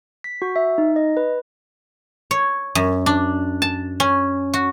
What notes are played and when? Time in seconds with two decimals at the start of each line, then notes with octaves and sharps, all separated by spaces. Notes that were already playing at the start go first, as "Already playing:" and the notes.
0.24 B6
0.42 F#4
0.56 E5
0.78 D#4
0.96 D#5
1.17 B4
2.31 C#5
2.75 F#2
3.06 D4
3.62 A5
4.00 C#4
4.54 F#4